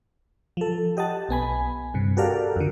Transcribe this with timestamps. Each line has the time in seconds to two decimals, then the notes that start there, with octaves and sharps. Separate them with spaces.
0.57 F3 A4
0.97 G4 D#5 F#5 A5
1.29 B1 B3 G#5 B5
1.94 G2 C3
2.17 F#4 G4 A4 A#4 D5 F5
2.56 F2 D3